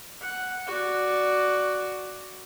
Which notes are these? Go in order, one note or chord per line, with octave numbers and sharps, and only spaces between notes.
F#5
F#4 D5